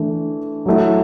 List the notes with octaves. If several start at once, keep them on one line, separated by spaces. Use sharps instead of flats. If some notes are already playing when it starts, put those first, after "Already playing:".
Already playing: E3 A3 D4
F#3 A3 E4